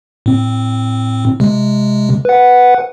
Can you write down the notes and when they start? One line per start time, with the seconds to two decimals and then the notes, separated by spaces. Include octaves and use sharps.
0.26 A2 C4
1.40 C3 G#3
2.25 B4 F#5